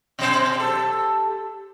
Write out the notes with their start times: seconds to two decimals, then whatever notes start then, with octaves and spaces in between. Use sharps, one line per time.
0.19 B2 F#3 C5
0.56 G4 A4